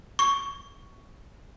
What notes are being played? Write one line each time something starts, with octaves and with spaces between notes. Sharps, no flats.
C#6